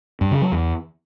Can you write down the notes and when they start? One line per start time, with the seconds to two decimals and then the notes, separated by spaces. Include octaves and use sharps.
0.21 G2
0.31 C#3
0.42 F#3
0.52 E2